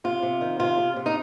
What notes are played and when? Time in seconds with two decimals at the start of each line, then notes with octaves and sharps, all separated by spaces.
0.04 C3 F4
0.22 C3
0.41 D#3
0.59 C3 F4
0.78 C3
0.96 C3
1.06 D#4